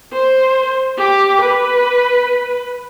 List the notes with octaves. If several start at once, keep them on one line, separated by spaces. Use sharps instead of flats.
C5
G4 D6
B4